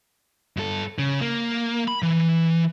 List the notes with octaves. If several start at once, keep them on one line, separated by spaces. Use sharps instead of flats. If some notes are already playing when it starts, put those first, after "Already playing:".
G2 A4
C#3
A#3
B5
E3